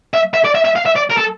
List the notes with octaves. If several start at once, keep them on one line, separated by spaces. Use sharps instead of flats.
E5
E5
D5
E5
E5
F5
E5
D5
A#4
A4